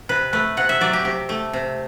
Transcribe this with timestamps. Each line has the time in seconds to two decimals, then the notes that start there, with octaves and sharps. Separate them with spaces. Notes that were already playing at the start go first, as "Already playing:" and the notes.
0.09 C3 B4
0.33 A3 B4
0.57 C3 F#5
0.69 E5
0.81 F#3 D5
0.93 G4
1.05 C3 G4
1.29 A3
1.53 C3